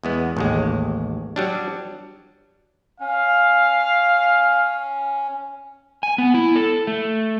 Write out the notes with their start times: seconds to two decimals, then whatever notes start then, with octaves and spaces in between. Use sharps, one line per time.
0.03 E2 G#3 B3
0.37 A1 D#2 G#3
1.36 F#3 G3 D4
3.00 C#4 F5
6.03 G#5
6.18 B3
6.34 E4
6.56 A4
6.87 A3